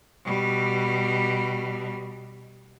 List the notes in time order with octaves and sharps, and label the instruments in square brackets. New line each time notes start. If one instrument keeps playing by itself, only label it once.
[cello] B2 G3